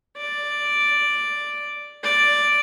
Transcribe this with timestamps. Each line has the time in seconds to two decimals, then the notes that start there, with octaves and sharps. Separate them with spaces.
0.17 D5
2.03 D5